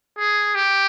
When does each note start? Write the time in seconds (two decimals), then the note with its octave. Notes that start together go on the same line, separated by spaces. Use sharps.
0.17 G#4
0.55 G4